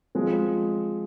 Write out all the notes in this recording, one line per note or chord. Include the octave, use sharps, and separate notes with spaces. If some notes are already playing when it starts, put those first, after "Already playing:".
F3 G#3 C4